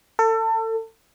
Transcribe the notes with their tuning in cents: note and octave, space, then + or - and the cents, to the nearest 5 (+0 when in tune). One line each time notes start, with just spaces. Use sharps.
A4 +30